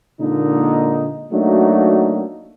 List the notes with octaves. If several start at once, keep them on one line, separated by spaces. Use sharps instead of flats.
A#2 D3 G#3 A#3 D#4
F#3 A3 A#3 D4 D#4 F#4